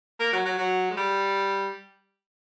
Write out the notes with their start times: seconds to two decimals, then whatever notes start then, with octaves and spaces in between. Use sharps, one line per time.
0.20 A#3
0.33 F#3
0.45 F#3
0.58 F#3
0.91 G#3
0.97 G3